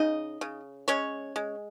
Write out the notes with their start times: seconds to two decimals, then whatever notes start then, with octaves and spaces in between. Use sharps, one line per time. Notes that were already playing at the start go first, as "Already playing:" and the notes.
Already playing: C#3 D#4 D#5
0.41 C#3
0.88 G#3 C#4 C#5
1.36 G#3